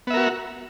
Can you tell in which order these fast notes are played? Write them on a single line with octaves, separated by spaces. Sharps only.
B3 E5 A#4 F#4